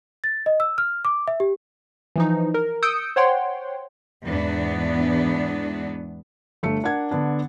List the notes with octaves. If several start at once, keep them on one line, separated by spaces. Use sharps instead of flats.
A6
D#5
E6
F6
D6
E5
G4
E3 F3 D#4
A#4
D#6 E6 G6 C#7 D7
C5 C#5 F#5 G5 C6
E2 G#2 B3 D4
G1 A3 E5 C#7
D4 A#4 F#5 G#6
D3 B3 D4